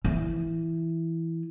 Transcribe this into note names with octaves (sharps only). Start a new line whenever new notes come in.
E3